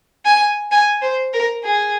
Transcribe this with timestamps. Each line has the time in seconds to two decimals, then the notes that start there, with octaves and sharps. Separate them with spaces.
0.25 G#5
0.71 G#5
1.02 C5
1.33 A#4
1.64 G#4